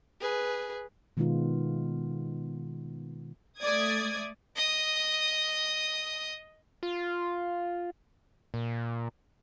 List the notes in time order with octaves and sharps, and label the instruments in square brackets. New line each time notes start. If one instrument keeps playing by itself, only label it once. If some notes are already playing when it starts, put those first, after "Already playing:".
[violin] G#4 B4
[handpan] B2 D#3 G#3 B3 D#4 F4
[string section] A3 D5 D#6 G#6
[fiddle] D#5 D#6
[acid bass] F4
A#2